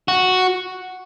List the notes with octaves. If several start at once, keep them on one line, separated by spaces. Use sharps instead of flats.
F#4